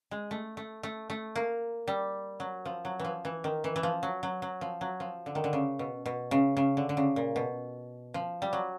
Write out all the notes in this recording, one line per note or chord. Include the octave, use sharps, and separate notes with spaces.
G#3
A3
A3
A3
A3
A#3
G3
F#3
F3
F#3
E3 F3
E3
D#3
E3
E3
F3
F#3
F#3
F#3
F3
F#3
F3
D3
D#3
D3
C#3
B2
B2
C#3
C#3
D3
D3
C#3
A#2
B2
F3
G3
F#3